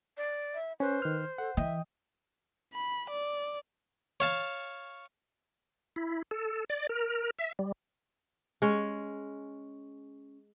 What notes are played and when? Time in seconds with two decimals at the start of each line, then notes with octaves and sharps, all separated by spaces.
0.17 D5
0.54 E5
0.80 C#4 B4 C5
1.02 D#3 F6
1.38 A4 F#5
1.57 E3 D#5 E5 G5 D#6
2.74 B5
3.10 D5
4.20 C#5 F5 A5
5.96 E4
6.31 A4
6.70 D5
6.89 A#4
7.39 E5
7.59 G3
8.62 G#3 C#4